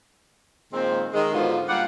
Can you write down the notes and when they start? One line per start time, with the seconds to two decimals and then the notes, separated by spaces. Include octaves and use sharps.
0.73 A#2 D#3 F3 G#3 C4
1.14 D#3 G#3
1.33 G#2 D3 F3 F#3 B3 F4
1.69 A#2 G3 F4 G4 F#5